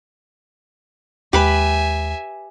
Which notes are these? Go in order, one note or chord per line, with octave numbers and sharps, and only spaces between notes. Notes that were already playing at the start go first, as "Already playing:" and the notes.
D#2 G#3 G4 B4 E5 G#5 B5